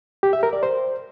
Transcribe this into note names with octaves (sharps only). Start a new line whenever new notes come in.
G4
E5
A#4
D5
C5